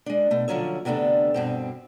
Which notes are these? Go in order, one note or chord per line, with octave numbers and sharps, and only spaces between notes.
G#3 D4
B2 A3
D3 F3 F#3 C#4 E5
D2 C3 B3 D4 A4
G2 B2 C4